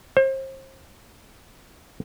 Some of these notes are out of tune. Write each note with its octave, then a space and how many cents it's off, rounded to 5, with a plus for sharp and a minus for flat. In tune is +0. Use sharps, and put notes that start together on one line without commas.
C5 +35